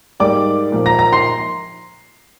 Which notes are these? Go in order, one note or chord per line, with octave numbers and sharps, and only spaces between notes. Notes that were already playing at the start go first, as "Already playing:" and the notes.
G#2 G3 A#3 D5 D6
A#2 F3 A#3
A#5 A#6
A#5 A#6
C6 C7